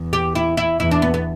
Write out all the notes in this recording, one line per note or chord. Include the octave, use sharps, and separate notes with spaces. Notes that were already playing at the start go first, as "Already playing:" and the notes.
Already playing: E2
G4
E4
E4
E2 E4
D4
B3
B3